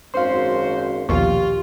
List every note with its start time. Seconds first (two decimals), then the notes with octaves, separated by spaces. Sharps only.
0.14 G#1 F#2 F#4 C5 F5 C6
1.09 A#1 D#2 B2 F4 G4 C#6